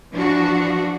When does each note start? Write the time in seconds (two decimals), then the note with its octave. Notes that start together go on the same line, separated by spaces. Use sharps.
0.12 E3 F3 D4 F#4